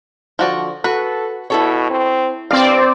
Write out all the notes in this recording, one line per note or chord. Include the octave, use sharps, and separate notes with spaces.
D3 F3 F#4 D5
F#4 A4 B4
B2 E4 A4 C#5
C4
G2 C4 D5 F5